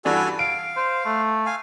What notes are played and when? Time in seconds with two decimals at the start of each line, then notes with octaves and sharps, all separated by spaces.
0.05 G2 E3 D4 F#4 A4 G#5
0.39 F5 D7
0.76 C5
1.06 A3
1.46 F5 G#5